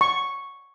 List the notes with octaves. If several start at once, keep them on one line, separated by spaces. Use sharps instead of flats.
C#6